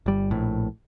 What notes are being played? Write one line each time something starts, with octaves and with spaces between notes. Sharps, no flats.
G1 G3
A#1 A2